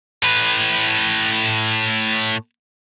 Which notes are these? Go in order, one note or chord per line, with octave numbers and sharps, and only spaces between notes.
A2 B4